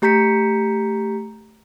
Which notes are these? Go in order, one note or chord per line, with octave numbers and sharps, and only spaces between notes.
A3 G4 A#5 G6 B6 C#7